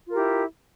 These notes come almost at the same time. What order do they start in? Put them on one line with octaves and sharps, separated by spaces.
F4 A#4 G4 E4